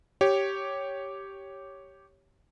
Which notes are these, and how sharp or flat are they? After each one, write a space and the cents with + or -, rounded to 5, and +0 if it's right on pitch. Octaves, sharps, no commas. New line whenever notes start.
G4 -5 C#5 +0